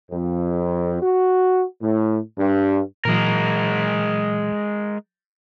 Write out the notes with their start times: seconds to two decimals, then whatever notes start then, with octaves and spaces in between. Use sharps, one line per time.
0.10 F2
1.01 F#4
1.81 A2
2.36 G2
3.05 A#2 E3 F#3 G#3 A#4